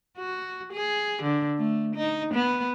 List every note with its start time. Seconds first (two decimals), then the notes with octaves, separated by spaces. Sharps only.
0.17 F#4
0.73 G#4
1.22 D3
1.58 A3
1.95 D#4
2.34 B3